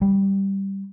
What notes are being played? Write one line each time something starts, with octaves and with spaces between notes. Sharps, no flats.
G3